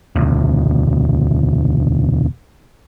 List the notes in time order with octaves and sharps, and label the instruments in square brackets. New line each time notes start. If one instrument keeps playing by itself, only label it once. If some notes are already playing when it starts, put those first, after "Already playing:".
[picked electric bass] E1 D2